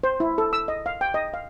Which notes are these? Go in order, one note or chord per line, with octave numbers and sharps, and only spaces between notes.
C5
E4
A4
E6
D#5
F5
G5
D#5
F5